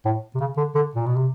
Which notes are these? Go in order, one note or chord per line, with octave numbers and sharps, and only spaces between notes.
A2
C3
C#3
D3
D3
A#2
B2
C3